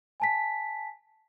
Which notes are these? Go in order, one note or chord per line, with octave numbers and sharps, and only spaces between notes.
G#5 A5 B6